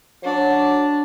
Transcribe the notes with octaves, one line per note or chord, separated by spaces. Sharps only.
F#3 D4